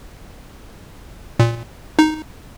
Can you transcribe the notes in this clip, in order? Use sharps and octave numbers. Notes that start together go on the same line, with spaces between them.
A#2
D#4